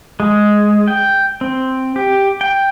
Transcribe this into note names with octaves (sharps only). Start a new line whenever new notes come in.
G#3
G5
C4
G4
G5